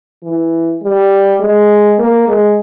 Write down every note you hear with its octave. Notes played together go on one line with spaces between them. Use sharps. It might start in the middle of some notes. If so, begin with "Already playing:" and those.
E3
G3
G#3
A#3
G#3